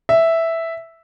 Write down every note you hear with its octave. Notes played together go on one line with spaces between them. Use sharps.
E5